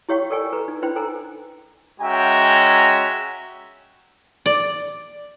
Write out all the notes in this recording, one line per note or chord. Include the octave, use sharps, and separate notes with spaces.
E4 G4 C#5 F5 G5 C#6
A4 A#4 D5 G5 G#5 C#6
A4 B4 A#5
D#4
D4 E4 B4 C5 G5 B5
A4 A#4 C5 G5 G#5 A#5
G#3 C#4 F#4 E5 G5 A#5
D5